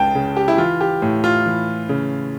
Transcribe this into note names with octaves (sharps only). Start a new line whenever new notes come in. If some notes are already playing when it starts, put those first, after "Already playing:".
Already playing: C#2 C#3 G5 A5
C#3
G4
E4
E3 F4
G4
A2
F4
E3
C#3